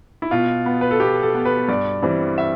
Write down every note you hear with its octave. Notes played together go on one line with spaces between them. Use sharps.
E4
B2 F4
B3
B4
A4
B2 G4
A4
B3
B4
G2 D5
E3 G3 C4
E5